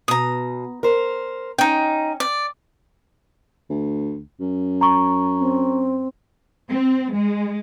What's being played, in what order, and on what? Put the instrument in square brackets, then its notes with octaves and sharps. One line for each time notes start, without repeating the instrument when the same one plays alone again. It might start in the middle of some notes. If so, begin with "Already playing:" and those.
[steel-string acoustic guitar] B2 [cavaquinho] A#5 D#6
[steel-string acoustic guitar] A#4 C5
[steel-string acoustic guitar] C#4 [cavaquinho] D#4 G5
[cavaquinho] D5
[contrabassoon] D2
F#2
[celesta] A#5 C#6
[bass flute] C4
[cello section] C4
G#3